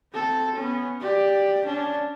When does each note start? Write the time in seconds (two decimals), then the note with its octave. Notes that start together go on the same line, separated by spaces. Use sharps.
0.13 C4 A4
0.57 B3 C#4
1.01 G4 D5
1.66 C#4 D4